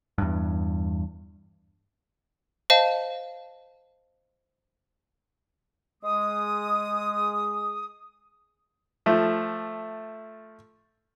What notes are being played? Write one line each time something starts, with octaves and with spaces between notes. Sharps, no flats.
E2 G2
C5 D#5 F5 A5
G#3 D#6
F3 A3